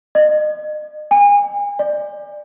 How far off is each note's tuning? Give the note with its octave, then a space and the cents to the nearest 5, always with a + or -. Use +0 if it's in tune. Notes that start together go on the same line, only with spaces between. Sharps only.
D#5 -40
G#5 -35
D5 +25